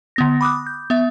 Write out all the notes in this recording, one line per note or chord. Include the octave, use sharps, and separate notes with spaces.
D3 B3 A#6
B5 D6 D#6 F#6
G6
B3 E5